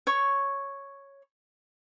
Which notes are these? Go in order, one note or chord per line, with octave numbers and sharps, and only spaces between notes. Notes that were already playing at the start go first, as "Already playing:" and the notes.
C#5 C#6